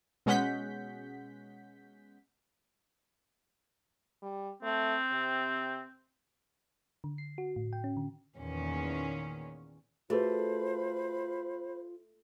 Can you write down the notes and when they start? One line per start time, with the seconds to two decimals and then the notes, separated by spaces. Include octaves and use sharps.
0.26 B2 G#3 C#4 F#5 G6 B6
4.22 G3
4.63 A3 C4
5.12 C3
7.04 D3
7.18 C7
7.38 F#4
7.56 A2
7.73 G5
7.84 C#4
7.97 D3
8.36 E2 A#2 D#3 C#4
10.10 A3 F4 F#4 G#4 B4 C5 B5